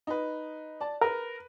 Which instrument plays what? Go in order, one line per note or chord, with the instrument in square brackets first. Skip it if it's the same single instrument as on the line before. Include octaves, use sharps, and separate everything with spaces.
[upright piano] D#4 B4
D5 A5
[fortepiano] A#4 [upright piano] B4